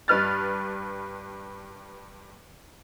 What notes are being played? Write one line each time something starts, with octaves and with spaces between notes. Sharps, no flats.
G2 B4 F6 A6